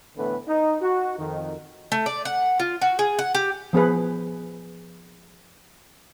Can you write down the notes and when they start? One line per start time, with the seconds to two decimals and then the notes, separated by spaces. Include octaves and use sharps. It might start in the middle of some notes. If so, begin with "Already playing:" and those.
0.17 A2 D3 E3 A3 B3 B4
0.48 D#4
0.82 F#4
1.19 F2 D#3
1.92 A3
2.06 D5
2.25 F#5
2.60 F4
2.82 F#4
2.99 G#4
3.19 F#5
3.34 G4
3.73 F3 B3 G#4 B4